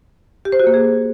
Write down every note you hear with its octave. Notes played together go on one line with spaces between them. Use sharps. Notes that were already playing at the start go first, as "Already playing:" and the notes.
G4
C5
F#4
A#3
G#4